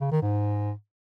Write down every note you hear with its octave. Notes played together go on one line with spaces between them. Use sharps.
C#3
D#3
G#2